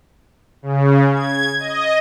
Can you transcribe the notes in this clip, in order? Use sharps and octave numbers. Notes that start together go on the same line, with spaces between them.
C#3
G#6
D#5